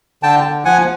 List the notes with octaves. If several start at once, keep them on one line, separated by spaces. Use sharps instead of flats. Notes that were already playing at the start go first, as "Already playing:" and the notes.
D3 G5 A5
D3
F3 F#5 G#5